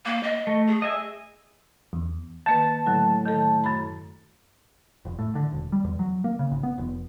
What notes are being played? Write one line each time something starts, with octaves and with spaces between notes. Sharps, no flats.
A#3
D#5
A3
G#4
D#5 E5 G#5
E2
D#3 A#3 B4 A5
A2 D3 F#3
D#3 A4
F#2 B5
F1
A2
D3
E1
G3
E2
F#3
A#3
C#3
G#1
B3
F1